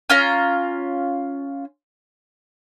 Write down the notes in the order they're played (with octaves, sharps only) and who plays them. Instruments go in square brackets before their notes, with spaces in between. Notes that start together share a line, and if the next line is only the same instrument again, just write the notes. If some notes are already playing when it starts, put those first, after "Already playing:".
[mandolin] C#4 F4 F5 A#5